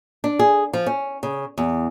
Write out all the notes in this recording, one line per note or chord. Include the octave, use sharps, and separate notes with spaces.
D4
G#4
F3
C#4
C#3
E2